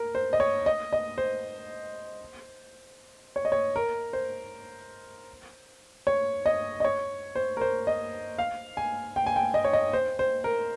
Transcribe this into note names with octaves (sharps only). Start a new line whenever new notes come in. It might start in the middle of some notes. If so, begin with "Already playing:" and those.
Already playing: A#4
C5
D#5
C#5
D#5
D#5
C5
C#5
D#5
C#5
A#4
C5
C#5
D#5
D#5
C#5
C5
A#4
C5
D#5
F5
G#5
G5
G#5
G5
D#5
C#5
D#5
C5
C5
A#4